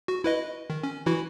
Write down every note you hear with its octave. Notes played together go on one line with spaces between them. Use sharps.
F#4
E4 B4 D#5
D#3
C#4
E3 E4 F#4